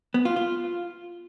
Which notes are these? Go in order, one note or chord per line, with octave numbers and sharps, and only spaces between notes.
B3
F4
F4